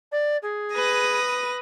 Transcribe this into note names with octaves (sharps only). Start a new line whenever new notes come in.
D5
G#4
B4 D#6 A#6